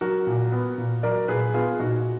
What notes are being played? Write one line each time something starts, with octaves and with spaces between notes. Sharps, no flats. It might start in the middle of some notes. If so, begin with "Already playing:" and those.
F#3 F#4 A#4
A#2
B3
A#2
F#3 A#4 D5
A#2 G#4 B4
B3 F4 G#4
A#2 D#4 F#4